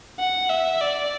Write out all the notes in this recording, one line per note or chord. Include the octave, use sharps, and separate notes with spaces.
F#5
E5
D5